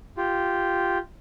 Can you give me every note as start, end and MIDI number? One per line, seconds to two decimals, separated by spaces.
0.17 0.98 65
0.17 0.98 67